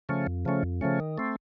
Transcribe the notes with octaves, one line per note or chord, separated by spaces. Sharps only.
C#3 F3 A3 C#4
F2
C#3 F3 A3 C#4
F2
C#3 F3 A3 C#4
D#3
A3 C4